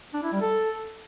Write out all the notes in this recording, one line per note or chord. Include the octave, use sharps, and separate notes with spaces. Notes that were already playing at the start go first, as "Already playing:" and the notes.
D4
E4
G3
A4